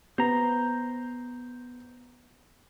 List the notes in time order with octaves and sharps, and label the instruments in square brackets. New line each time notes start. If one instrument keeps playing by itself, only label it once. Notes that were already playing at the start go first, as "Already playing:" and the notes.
[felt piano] B3 [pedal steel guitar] C5 A#5